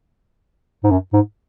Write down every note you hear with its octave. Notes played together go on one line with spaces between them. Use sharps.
G#2
F#2
G#2